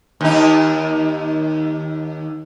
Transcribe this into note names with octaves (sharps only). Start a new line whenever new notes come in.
D#2 D#4